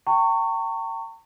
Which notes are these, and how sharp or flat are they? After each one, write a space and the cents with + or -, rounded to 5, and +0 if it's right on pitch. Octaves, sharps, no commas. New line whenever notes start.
G5 -20 A#5 -45 C#6 +0